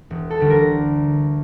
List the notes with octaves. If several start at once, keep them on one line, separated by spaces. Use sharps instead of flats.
E1
A4
D2 D3 G3
A#4